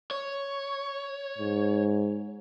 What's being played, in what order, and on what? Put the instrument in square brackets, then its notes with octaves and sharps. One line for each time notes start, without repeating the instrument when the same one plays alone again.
[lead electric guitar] C#5
[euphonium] G#2